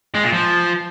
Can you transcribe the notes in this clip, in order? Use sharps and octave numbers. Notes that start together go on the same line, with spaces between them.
G#3
A#2
F3